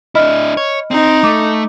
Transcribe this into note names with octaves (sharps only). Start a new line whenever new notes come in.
D4 E4 D#5 B5 F6
C#5
C4 D#4
A3 D6